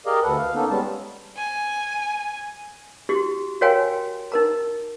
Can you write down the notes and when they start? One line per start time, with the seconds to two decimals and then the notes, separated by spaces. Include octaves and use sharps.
0.06 G4 G#4 A#4 D5 D#5 F5
0.23 D2 A4 B4 F#5
0.37 F5
0.54 A#3 B3 C#4 D#4 A4
0.70 G3 G#3 B3 C#4 A5
1.36 G#5
3.09 E4 F#4 G4 C6
3.61 F#4 A#4 C#5 F5 G5 G#5
4.32 D#4 A#4 A#5